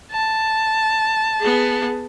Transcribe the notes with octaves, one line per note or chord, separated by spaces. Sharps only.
A5
B3 G#4